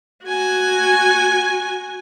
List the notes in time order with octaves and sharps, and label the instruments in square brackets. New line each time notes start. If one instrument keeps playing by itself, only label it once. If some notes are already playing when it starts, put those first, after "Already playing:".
[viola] F#4 G#5